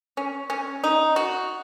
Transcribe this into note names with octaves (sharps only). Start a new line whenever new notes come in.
C#4
C#4
D#4
F#4